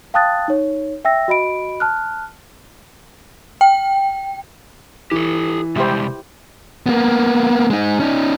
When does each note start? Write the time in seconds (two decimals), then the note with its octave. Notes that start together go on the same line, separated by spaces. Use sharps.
0.14 F5 G5 A5 D#6 F#6 A6
0.48 D#4 C#5
1.05 E5 G5 E6 A#6
1.28 F#4 D#5 B5 D7
1.80 A5 F6 F#6
3.61 G5
5.11 E3 G4 A4
5.76 C3 G3 G#3 E4 G4 C5
6.86 A#3 B3
7.70 G#3 D#4
8.00 C#4 D#4